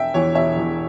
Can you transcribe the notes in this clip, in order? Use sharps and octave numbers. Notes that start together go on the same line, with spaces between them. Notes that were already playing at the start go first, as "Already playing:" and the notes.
Already playing: E1 E5 G5
E2 E3 C#5
E1 C#5 E5
E2 E3